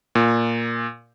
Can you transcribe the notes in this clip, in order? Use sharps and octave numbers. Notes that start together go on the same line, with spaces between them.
A#2